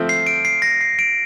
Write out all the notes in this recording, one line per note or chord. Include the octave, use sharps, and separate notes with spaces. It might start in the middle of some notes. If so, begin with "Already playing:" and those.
Already playing: F3 A3 C4
C7
D7
C7
A#6
C7
D7